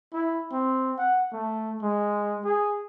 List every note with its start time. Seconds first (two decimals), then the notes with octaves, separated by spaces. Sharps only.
0.13 E4
0.52 C4
0.98 F#5
1.33 A3
1.82 G#3
2.44 G#4